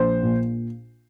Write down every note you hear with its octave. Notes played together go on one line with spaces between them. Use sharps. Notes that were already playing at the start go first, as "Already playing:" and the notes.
Already playing: A#1 C5
A#2